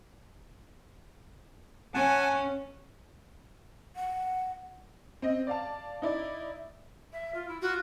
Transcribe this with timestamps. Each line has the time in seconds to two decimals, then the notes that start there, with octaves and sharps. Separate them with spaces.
1.94 C#4 F#5 G#5 A5
3.96 F#5
5.22 C4 D#5
5.47 D5 F5 A5
6.02 D#4 E4 D5
7.13 E5
7.35 F4
7.48 E4
7.62 F4 F#4